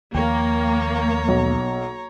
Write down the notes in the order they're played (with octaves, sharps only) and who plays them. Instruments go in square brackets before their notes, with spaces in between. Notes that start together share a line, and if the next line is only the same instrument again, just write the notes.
[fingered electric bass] D#2 D#3 F3 [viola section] A#3 [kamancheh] C#5 A#5 [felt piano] G5
[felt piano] B1